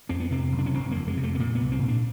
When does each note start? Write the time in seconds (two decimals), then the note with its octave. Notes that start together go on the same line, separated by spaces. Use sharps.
0.09 F2 C4
0.20 B3
0.31 C3 C4
0.52 F#1
0.59 D4
0.66 C#4
0.74 F#1 C4
0.91 F2 A#3
1.08 G#3
1.17 C3
1.23 A3
1.35 B3
1.39 A#2 A#3
1.55 B3
1.61 C2
1.72 C4
1.82 A#2
1.88 D4